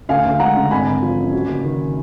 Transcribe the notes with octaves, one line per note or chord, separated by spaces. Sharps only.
D2 F5 G#5
D2
G#3 F#5 A#5
D3
G#1 G#5 B5
G#1
F3
F#2
F#3
F#1
D#3